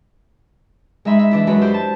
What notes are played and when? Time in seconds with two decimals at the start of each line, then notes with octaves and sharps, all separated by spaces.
1.05 G#3 D#4 E5 B5 C6
1.19 E5
1.31 E3 D4 E4
1.47 F#2 G#3 D4 F#4 B4 B5
1.61 E4 G4 C5
1.74 A5